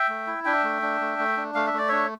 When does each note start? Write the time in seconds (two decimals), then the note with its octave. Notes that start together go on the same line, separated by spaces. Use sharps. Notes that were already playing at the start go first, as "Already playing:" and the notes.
Already playing: E5 G5
0.09 A3
0.27 E4
0.45 D4 E5 G5
0.63 A3
0.82 D4
1.01 A3
1.19 A3
1.37 D4
1.55 A3 F5
1.67 E5
1.73 A3 D5
1.88 D4 C#5 E5